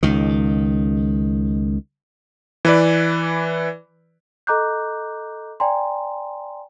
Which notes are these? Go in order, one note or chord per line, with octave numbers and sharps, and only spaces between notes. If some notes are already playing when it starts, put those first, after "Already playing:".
C#2 D#3
E3 B4 D5
A4 D#5 A#5 D6 F#6 G6
D5 G5 G#5 A#5 C6